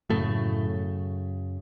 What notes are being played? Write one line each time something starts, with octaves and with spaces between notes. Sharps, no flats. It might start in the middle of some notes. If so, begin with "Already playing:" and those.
F#2 A2 C#3 A3